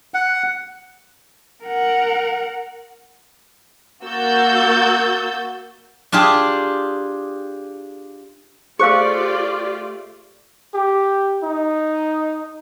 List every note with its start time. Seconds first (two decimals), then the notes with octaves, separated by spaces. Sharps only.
0.14 F#5
1.64 A#4 F#5
4.05 A#3 F#4 E6 G6 A6
6.12 D4 F4 G4 G#4
8.79 A3 F4 G4 G#4 C5 D5 F5 C#6
10.74 G4
11.43 D#4